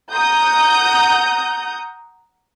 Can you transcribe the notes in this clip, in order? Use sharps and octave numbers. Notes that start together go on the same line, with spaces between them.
F#5 A#5 D#6 G6